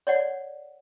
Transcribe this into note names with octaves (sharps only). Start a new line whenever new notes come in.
C#5 D5 F#5